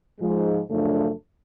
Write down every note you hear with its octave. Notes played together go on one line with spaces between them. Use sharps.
G#2 F3 G#3
F#2 C#3 F3 A3 D4